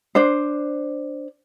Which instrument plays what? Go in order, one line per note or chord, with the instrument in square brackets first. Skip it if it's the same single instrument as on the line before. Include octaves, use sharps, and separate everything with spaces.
[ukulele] D4 C5